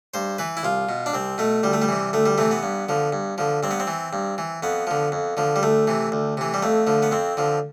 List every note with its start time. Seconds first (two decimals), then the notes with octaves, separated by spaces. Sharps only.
0.14 G2 C5
0.38 E3 B4
0.57 E4
0.63 C2 F4
0.89 B2
1.06 D4
1.13 C2 C4
1.38 B2 A3
1.63 D2 G3
1.73 A3
1.82 G3
1.88 C3 E3
2.13 D2 A3
2.26 G3
2.38 C3 E3 A3
2.51 B3
2.63 G2
2.89 D3 F3
3.13 G2
3.38 D3 F3
3.63 G2 C4
3.71 B3
3.80 C4
3.87 E3
4.13 G2
4.38 E3
4.63 F2 B3
4.87 D3 F3
5.12 F2
5.37 D3 F3
5.56 G3
5.63 D2 A3
5.87 C3 E3
6.12 D2
6.37 C3 E3
6.54 G3
6.62 F2 A3
6.87 D3 F3
7.03 B3
7.11 F2 C4
7.37 D3 F3